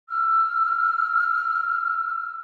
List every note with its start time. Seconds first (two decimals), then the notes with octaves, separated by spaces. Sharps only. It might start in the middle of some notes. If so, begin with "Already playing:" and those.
0.08 E6 F6